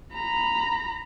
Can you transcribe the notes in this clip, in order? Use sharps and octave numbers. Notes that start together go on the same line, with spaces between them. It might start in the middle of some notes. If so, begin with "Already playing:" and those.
A#5 B5